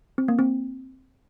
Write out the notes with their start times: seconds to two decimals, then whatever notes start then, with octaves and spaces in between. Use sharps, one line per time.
0.18 C4
0.28 A#3
0.39 C4